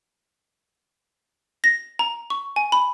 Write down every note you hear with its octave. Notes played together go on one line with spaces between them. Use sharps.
A#6
A#5
C#6
G#5
B5